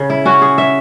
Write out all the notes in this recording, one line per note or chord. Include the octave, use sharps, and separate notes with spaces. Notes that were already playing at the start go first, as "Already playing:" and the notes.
Already playing: C#3
E4
C#4 F#4
G#4
E5